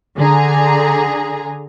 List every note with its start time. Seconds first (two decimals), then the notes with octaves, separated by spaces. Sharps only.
0.17 D3 G#4 A#5